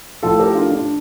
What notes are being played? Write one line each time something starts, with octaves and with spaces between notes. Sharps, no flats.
A2 F3 A3 F4 A4
G4 A#4
D4 F4
D4